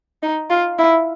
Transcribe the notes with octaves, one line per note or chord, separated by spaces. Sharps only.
D#4
F4
E4